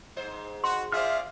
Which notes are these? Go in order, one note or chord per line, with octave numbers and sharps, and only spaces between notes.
G#2 D#4 C5
F#4 C6
F4 G#4 C5 D5 E5 F5 F6